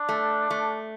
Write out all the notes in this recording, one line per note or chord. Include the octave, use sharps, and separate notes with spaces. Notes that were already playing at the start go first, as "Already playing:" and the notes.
Already playing: D4
A3
A3